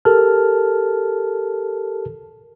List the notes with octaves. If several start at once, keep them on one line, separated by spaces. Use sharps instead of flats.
G4 A4 A#4 A5 F6